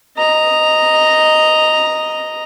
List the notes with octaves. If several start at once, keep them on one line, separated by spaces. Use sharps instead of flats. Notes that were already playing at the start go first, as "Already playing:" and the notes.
D#5 A#5